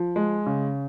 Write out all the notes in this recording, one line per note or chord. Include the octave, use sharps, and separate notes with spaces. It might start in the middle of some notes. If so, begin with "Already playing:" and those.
Already playing: F3
G#3
C#3